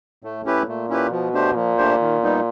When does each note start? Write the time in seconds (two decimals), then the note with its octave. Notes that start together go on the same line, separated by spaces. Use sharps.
0.23 A2 A3
0.45 C#4 E4 G4 B4
0.67 A#2 A3
0.89 C#4 E4 G4 B4
1.11 B2 F3
1.33 A3 D4 G4 C5
1.55 A#2 F3
1.78 A3 D4 G4 C5
2.00 D#3
2.23 G3 B3 D#4